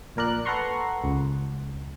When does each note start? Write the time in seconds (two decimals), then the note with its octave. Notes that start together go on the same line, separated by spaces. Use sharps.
0.16 A#1 A#2 A#4 D5 F#6
0.45 A4 B4 F#5 A#5 C6 C#6
1.04 C#2